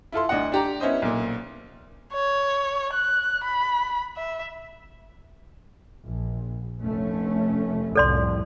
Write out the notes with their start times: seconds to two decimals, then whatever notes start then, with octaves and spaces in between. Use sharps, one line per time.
0.12 E4 F4 A4 C6
0.29 D2 D4 D#5 F#5
0.52 D4 G4 A#5
0.80 B3 C#4 E4 C5 D#5
1.02 B1 A#2
2.13 C#5
2.93 F#6
3.44 B5
4.17 E5
6.05 A#1
6.82 F1 A3 C#4
7.96 C2 F2 A2 A4 D5 C6